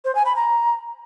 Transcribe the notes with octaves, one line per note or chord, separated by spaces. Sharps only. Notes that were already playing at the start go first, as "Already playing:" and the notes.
C5
G#5
B5
A#5